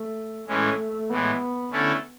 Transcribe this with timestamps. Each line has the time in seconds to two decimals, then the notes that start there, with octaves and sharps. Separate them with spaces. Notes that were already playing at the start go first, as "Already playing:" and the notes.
Already playing: A3
0.48 A2 E3 G#3 A3 C#4
1.10 A2 E3 G#3 B3
1.71 D3 A3 C#4 E4 A4